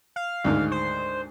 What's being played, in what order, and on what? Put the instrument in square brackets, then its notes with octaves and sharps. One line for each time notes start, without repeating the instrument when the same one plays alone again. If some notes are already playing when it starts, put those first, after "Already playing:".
[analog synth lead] F5
[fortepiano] D2 G#2 D#3
[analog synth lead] C5